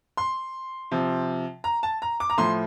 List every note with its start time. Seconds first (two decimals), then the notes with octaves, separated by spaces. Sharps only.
0.17 C6
0.91 C3 F3
1.64 A#5
1.83 A5
2.02 A#5
2.20 D6
2.30 A#5
2.38 A2 F3 C6